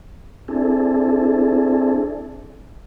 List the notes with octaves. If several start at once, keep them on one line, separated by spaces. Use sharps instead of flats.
C4 D4 E4 G#4 A4